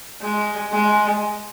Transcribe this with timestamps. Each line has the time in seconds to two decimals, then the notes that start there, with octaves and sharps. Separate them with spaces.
0.22 G#3
0.73 G#3